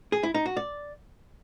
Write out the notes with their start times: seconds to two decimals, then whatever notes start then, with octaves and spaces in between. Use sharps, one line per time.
0.12 G#4
0.23 E4
0.34 D#4
0.45 F#4
0.57 D5